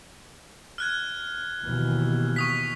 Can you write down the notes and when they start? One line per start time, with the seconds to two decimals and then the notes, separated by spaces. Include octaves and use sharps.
0.78 F6 F#6 G#6
1.64 D#2 B2 E3
2.36 C#6 D#6 B6